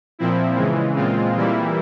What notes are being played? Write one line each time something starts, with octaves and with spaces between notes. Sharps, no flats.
A#2 F3 C4 E4
C#3 E3 G#3
A#2 G#3 C4 F4
E3 G3 A#3 E4